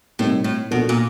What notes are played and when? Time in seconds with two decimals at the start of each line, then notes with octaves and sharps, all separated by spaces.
0.19 A2 C3 D#3 G3 C4
0.44 A2
0.71 B2 F3 A#3 D4 F#4 A4
0.89 A#2